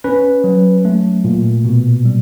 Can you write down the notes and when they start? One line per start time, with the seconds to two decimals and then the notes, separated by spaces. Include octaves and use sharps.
0.04 C#4 B4
0.44 F#3
0.85 A3
1.24 A#2
1.64 B2
2.05 G3